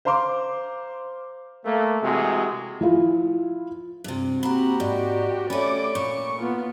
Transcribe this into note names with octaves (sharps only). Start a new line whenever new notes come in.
C5 F5 A#5 C6 D6
A3 A#3
C3 E3 G#3 F#4 G#4
F3 E4 F4
G2 C3
A#3 C4 F#4 G4 F#5 A#5 B5
G#2 D5
A3 C#4 C#5 D5 B5 D6
A#2 C#6
A#3 B3 F4